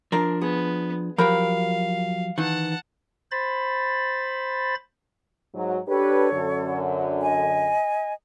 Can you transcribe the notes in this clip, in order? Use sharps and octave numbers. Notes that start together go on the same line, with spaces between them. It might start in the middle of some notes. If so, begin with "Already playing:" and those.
F3 D4 A#4
B3 G#4
F3 F#3 G4 A#4 F5 B5
D#3 E3 F#5 A5
C5 B5 A6
G#2 F#3
D4 G4 A4 B4 C#5
F#2 D3
D#5 G#5